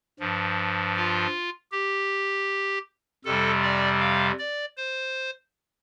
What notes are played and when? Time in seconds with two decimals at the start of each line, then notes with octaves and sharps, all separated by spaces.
0.20 G2 F3
0.96 F4
1.72 G4
3.25 F2 C3 G3 A4
3.63 D5
4.01 F5
4.39 D5
4.77 C5